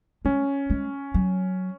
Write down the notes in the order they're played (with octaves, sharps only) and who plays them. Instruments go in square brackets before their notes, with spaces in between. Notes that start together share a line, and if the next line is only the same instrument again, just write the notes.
[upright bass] G#3 [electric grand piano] C#4
[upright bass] G#3
F#3